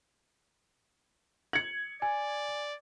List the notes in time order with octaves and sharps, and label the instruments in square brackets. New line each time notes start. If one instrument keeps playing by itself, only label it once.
[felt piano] G#6 C#7 [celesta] F#7
[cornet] D5 [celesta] G#5